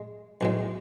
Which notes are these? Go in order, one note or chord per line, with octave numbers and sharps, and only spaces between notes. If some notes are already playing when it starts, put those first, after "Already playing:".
Already playing: G#3
B1 A2 G#3